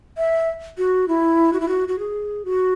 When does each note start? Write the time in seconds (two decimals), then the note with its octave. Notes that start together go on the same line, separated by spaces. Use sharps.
0.17 E5
0.78 F#4
1.08 E4
1.53 F#4
1.60 E4
1.68 F#4
1.88 F#4
1.99 G#4
2.45 F#4